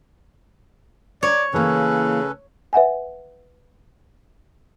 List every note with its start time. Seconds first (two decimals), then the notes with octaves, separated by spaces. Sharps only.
1.23 C#5 D5
1.54 C#3 E3 A#3 C#4 A4 B4
2.73 B4 E5 F#5 G#5